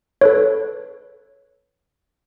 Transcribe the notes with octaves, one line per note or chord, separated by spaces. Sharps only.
A4 B4 C#5